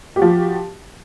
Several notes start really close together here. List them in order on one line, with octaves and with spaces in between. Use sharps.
G4 F#4 F3